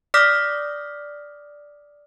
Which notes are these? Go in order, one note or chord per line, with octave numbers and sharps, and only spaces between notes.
D5 D6 D#6 F6 A#6 B6